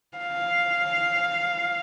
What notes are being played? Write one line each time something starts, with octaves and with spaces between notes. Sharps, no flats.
F5